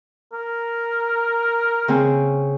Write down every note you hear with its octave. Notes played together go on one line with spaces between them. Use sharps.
A#4
C#3 C4 C#4